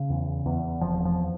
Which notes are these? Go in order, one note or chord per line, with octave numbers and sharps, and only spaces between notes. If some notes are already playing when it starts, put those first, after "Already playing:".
Already playing: C#3
E2
E2
F1 F3
F3